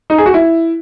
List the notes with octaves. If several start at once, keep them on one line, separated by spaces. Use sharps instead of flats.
D#4
G#4
F#4
E4